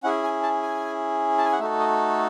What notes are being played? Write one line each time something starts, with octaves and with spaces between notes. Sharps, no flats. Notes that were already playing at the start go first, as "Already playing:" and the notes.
C#4 E4 G#4 F#5
G#5
A5
G#5
A5
G#5
F#5
A3 D#4 F#4 A4 E5
D#5